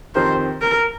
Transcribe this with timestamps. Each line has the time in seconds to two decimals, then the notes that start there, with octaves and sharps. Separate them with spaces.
0.15 F2 D#3 C4 G4 A#4 C5
0.61 A#4